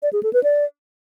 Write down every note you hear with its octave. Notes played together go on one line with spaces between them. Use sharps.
D5
G#4
A4
B4
D5